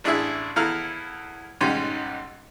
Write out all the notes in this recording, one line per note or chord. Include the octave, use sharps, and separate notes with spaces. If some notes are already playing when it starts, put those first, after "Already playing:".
A1 D4 E4 G#4 E5
E2 E4 A4 F5 A#5 F6
B1 G#2 G3 C#4 C6